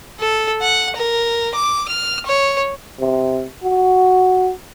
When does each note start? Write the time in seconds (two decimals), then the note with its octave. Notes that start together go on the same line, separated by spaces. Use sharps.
0.20 A4
0.62 F#5
0.96 A#4
1.54 D6
1.88 F6
2.26 C#5
3.00 C3
3.63 F#4